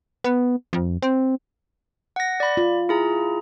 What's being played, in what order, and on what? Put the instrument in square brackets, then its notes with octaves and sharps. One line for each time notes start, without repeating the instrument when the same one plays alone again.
[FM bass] B3
F2
C4
[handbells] F#5 A#6
D5 B5
[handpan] F4
[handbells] E4 G#4 A#5